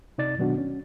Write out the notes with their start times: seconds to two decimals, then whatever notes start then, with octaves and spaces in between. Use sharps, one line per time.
0.18 C3 D#4 D5 A6
0.38 B2 D#3 F#3 B3 D4 F#4
0.58 C#4